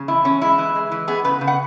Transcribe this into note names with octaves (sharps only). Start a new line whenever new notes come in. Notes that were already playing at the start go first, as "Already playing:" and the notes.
Already playing: C#3
E2 E4
E2 C#4
G#3 E4
E3
G#3
E3
B3 G#4
C#3 B4
C#3
F#5